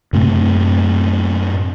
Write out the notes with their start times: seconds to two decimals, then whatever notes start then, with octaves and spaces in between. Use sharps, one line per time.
0.13 F#2 A2 C3 A3